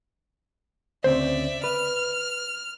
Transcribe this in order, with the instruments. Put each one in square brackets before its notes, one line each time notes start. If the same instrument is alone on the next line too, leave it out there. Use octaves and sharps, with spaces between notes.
[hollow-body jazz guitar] D2 C#3 C4 [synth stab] C5 [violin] D5 E5
[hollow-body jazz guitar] B4 [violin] F6